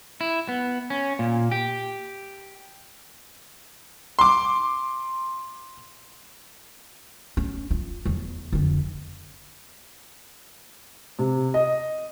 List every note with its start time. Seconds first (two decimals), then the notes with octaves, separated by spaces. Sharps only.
0.21 E4
0.49 B3
0.90 C#4
1.19 A#2
1.51 G4
4.19 C6 D6
7.37 C#4
7.71 F4
8.05 E2 F3
8.52 F2 D3
11.19 C3
11.54 D#5